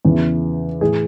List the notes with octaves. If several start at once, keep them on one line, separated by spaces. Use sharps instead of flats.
E2 C#3 E3
A2 E3 G#4